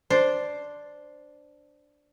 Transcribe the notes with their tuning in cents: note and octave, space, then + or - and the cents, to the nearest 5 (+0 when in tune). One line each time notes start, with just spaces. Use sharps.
D4 +0 C5 +0